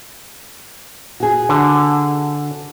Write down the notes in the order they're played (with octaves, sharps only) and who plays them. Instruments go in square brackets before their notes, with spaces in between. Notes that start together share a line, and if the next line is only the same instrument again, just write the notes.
[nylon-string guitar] F#4 G#4
[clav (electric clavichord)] D3